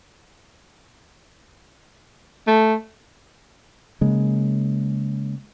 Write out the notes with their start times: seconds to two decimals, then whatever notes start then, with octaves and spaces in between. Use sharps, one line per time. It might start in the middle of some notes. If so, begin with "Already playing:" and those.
2.47 A3
4.01 C#3 G#3 A#3